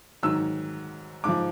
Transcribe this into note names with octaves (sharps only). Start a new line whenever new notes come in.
G#2 D#3 F#3 E6
G#2 F3 D6